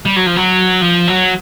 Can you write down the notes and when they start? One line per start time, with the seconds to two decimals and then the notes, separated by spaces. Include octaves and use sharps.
0.06 G3
0.16 F#3
0.26 F3
0.36 F#3
0.81 F3
1.08 F#3